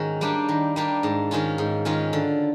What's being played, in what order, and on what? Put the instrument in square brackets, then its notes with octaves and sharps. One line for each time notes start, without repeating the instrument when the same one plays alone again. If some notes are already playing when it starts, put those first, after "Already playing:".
Already playing: [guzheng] G#2 D#3 G#3 C#4 F#4
G3 A#3 D4 G4
D#3
G3 A#3 D4 G4
G#2
D#3 G#3 C#4 F4
G#2
D#3 G#3 C#4 F4
D3